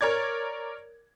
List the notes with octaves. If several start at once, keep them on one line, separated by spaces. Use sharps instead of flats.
A#4 C#5 D5 G#6